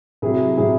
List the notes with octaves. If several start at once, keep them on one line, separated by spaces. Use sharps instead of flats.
C3 F#3 E4 G#4
C3 F#3 E4 G#4